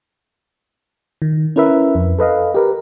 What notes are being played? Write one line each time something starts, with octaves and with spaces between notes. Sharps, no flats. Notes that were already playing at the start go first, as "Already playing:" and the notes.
D#3
C#4 E4 A#4 B4 E5
F2
A4 B4 D#5 F5
G4 A#4 B4